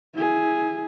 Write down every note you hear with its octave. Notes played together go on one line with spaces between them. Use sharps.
E4 G#4